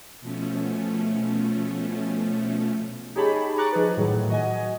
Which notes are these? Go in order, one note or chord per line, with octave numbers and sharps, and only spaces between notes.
B2 F3 A3 C#4
D#4 G4 G#4 C#5 A5 B5
A#5 C#6 D6 F#6 A6
F3 D#4 G#4 B4
A2 D#3 F#3
F#4 D#5 G#5